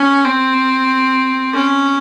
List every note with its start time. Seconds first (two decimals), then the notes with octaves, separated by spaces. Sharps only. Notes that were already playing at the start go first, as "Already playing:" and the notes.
Already playing: C#4
0.26 C4
1.54 C#4